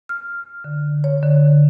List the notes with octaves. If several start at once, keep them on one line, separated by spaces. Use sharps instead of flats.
F6
D3
C#5
D3